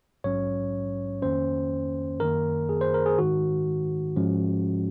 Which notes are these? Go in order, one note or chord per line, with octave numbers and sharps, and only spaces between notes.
A#1 G#2 F#3 C#4 C#5
F2 D#3 A#3 C#4 C5
F#2 D#3 A#3 A#4
G#4
C5
A#4
G#4
G#2 D#3 G#3 F#4
G#2 F3 G#3 C#4